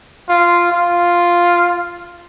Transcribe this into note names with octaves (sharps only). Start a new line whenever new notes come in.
F4
F4